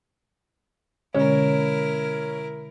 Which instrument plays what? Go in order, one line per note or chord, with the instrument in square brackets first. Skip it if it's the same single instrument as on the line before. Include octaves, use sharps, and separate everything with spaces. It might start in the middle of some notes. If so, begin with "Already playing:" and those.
[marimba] B2 D3 G#3 [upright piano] C#4 [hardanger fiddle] E4 A#4